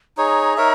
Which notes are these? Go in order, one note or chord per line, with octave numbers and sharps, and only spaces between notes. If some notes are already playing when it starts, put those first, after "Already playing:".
D#4 G#4 C#5 A#5
D#4 A#4 C#5 E5